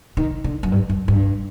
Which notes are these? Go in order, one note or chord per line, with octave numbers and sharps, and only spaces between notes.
D#3
D3
F#2
G2
F#2
G2